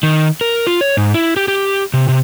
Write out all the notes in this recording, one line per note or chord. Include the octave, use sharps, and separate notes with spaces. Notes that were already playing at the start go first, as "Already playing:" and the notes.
D#3
A#4
F4
C#5
G#2
E4
G4
G4
C3
C3